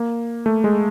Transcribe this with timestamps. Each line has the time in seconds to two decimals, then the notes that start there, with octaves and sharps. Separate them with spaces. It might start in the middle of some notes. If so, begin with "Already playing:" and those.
Already playing: A#3
0.46 A3
0.64 G#3